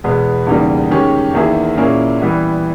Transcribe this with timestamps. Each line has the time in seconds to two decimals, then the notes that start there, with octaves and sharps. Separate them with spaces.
0.04 E2 B2 G#3 B3
0.47 E2 C#3 G3 A#3 D#4
0.91 D#3 G#3 C#4 G4
1.34 E2 D#3 A#3 E4 G#4
1.77 A#2 A#3 C#4 E4 G#4
2.20 E3 G3 B3 E4